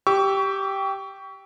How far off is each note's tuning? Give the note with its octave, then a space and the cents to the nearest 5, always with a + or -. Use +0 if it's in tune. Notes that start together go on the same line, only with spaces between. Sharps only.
G4 +0 C#6 +30 E6 +0